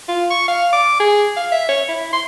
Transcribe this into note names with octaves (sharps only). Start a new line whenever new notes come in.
F4
C#6
F5
D6
G#4
F5
E5
C#5
E4
C6